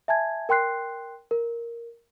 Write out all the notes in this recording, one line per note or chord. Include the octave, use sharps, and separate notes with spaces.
E5 G#5 A5 G#6
A#4 G5 C6 F#6 C7
A#4